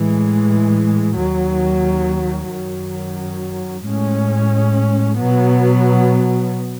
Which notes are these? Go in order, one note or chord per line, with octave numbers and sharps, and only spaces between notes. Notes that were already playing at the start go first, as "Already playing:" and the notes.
Already playing: A2 E3 G#3
D#2 D#3 F#3
F#2 D#3 F#3
A2 G#3 C#4
B2 F#3 B3